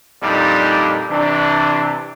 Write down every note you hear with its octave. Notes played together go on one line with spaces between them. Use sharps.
F2 A#2 G3 D4 D#4
C3 E3 D4